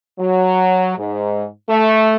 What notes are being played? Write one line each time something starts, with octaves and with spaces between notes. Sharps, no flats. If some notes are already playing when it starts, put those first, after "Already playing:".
F#3
G#2
A3